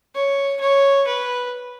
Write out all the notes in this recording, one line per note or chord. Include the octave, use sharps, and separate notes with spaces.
C#5
C#5
B4